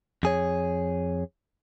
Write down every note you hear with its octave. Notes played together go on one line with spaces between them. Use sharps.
F2 G#4 C#5